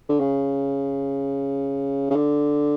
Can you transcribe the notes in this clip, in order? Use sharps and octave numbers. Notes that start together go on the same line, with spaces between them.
D3
C#3
C#3
D3